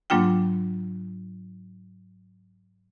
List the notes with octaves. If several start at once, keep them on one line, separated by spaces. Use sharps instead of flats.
G#2 F#3 A#3 D4 F4 G5